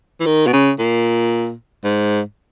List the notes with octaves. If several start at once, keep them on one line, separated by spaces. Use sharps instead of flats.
E3
D#3
B2
C#3
A#2
G#2